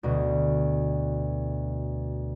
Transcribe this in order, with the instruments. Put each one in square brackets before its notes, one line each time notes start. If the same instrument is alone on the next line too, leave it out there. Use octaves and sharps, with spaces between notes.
[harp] D2 B2